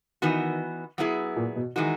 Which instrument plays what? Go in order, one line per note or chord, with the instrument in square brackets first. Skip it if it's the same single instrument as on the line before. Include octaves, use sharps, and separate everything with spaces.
[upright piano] D#3 [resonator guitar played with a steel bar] E3 B3 D#4 F#4
[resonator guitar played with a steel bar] F#3 B3 E4 G#4
[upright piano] A#2
B2
[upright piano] D#3 [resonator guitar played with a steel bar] E3 G#3 D#4 F#4